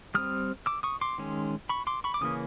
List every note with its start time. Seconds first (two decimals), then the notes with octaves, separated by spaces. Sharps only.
0.14 G3 C4 D#6 F6
0.66 D6 E6
0.83 C#6 D#6
1.01 C6 D6
1.18 D#3 G#3 C#4
1.69 B5 C#6
1.87 C6 D6
2.04 B5 C#6
2.14 D6
2.21 C#3 E3 A#3 C#4 D#6